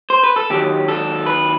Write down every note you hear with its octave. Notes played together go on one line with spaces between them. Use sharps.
C5
B4
A4
D#2 D#3 F#3 G4
A4
B4